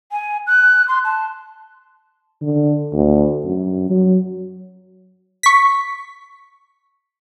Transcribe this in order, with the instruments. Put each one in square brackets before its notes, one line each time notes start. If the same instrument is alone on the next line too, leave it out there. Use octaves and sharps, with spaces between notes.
[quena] G#5
F#6
C6
A5
[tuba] D3
D2
F#2
F#3
[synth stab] C#6 B6